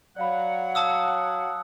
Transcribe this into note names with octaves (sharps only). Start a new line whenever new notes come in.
F#3 D5 F5 F#5 B5
F5 A5 D#6 E6